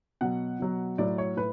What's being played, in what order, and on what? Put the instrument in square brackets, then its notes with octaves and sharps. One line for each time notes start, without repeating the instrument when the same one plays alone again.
[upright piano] B2 F#3 F#5
B2 F#3
A2 F#3 D5
C#5
A2 B4